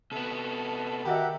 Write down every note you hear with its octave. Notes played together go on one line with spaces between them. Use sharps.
C3 B3 A4
D#3 F#4 G4 A#4 D#5 E5 F#5